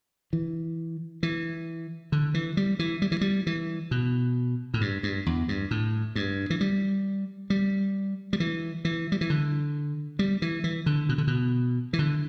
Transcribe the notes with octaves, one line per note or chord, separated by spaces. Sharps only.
E3
E3
D3
E3
G3
E3
G3
E3
G3
E3
B2
A2
G2
G2
E2
G2
A2
G2
E3
G3
G3
G3
E3
E3
G3
E3
D3
G3
E3
E3
D3
B2
D3
B2
E3
D3